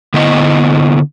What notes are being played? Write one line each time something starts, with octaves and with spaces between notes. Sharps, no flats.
D3 B3 E4 D#5